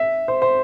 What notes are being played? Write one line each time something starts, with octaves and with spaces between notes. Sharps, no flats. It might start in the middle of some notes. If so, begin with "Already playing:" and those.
Already playing: E5
C5
C5